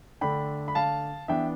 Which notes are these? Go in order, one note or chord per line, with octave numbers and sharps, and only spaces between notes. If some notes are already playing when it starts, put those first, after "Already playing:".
D3 A3 D4 G5 B5
B5
F5 A5
E3 B3 D4 E5 G5